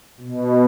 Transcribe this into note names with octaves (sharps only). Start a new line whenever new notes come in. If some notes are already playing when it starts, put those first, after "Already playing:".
B2